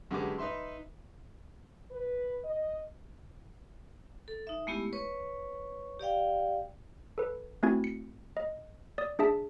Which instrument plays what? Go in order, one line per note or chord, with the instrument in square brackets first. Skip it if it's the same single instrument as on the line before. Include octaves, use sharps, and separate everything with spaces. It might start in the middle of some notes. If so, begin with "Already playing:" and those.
[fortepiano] F#2 D3 G#3 G4 B4 D6
D#4 B4 E5 C6
[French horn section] B4
D#5
[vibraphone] A4
D#4 E5
G#3 A3 B3 E4 G4
B4 C#5 C#6
G4 D5 F5 G5
[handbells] A4 B4
A3 C4 E4 F#4 G#5 G#6
C#7
D#5
D5 D#6
D4 G#4 E5 A5